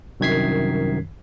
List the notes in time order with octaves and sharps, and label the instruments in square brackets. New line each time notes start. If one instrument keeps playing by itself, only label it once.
[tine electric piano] C2 F#2 D#3 G#6 B6 C7